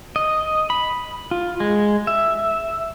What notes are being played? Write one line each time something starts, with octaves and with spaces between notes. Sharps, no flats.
D#5
B5
F4
G#3
E5